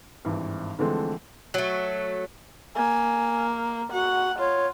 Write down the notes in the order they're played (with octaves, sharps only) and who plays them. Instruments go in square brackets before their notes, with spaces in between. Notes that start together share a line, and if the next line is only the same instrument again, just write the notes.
[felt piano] G#1 G2 E3
D3 E3 F3 G#3 A3 C4
[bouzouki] F#3 A3
[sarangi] A#3 [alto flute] G#5
[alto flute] F#4 [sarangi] F#5
[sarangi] F4 [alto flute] C#5